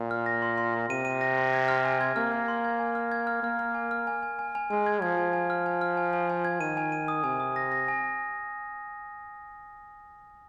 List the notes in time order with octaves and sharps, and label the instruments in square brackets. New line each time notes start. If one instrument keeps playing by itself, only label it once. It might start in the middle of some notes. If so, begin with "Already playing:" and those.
Already playing: [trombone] A#2
[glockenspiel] F6
A#6
C6
C6
C6
[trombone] C3 [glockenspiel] D#7
[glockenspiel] D#7
A#6
C6
G#6
F6
G#5
G#6
[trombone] A#3 [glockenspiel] F6
[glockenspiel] F6
C6
G#6
G#5
F6
G#6
F6
[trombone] A#3 [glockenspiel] F6
[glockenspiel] F6
G#5
F6
G#5
G#5
G#5
G#5
[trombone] G#3 [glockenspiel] G#5
[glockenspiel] G#6
[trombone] F3 [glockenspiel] G#6
[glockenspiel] G#5
G#5
F6
G#5
F6
G#5
G#5
G#5
G#6
[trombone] D#3 [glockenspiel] D#7
[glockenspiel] G#5
D#7
D#6
[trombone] C3 [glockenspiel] G#5
[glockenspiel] D#6
A#6
A#6
G#5